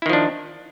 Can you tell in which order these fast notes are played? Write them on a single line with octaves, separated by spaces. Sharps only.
E4 D#3 F3 D4